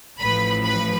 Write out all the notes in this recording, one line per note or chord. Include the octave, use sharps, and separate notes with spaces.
A1 A2 F3 B4 B5
B4 B5